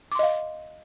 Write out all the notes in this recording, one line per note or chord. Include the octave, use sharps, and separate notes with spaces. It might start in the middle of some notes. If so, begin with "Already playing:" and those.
D#5 F5 C6 D6